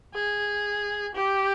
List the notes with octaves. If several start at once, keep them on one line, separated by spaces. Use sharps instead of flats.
G#4
G4